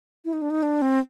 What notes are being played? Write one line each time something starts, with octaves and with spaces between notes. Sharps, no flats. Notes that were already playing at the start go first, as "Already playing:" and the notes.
E4
D#4
D4
D#4
D4
C4